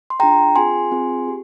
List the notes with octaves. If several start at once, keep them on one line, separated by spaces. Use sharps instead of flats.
C6
D4 F4 G#4 G5 A#5
C4 F4 G#4 G#5 C6
C4 F4 G#4
G4